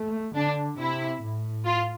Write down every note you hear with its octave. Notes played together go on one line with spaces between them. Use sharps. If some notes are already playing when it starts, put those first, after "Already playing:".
Already playing: A3
D3 D4
C3 E4
A2
F4